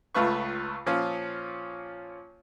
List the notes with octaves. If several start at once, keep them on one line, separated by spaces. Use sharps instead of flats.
C#2 A3 F4 B4 C#6
A#2 F3 C#4 F4